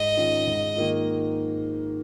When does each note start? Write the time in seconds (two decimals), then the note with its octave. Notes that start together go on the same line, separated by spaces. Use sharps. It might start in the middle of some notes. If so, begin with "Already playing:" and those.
Already playing: G#2 D#5
0.17 D#3 C#4 F4
0.47 G#2
0.76 D#3 A#3 F4